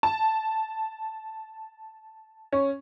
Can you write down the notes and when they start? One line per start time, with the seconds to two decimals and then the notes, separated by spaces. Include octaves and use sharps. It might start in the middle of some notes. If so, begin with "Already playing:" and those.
0.03 A5
2.52 C#4